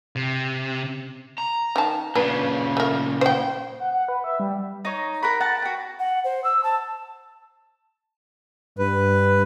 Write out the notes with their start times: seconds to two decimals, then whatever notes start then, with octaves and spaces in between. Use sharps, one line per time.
0.16 C3
1.38 A#5
1.76 D#3 A5
2.15 A#2 C#3 D4 B4
2.77 A3 A#4
3.21 C5 G5
3.80 F#5
3.94 F#5
4.08 B4
4.24 E5
4.40 G3
4.85 D#4 C#5
5.23 A#4 F#5 B5
5.40 F#5 A5
5.62 F#4 G5
5.99 F#5
6.24 C5
6.44 E6
6.63 A5
8.79 G2 B4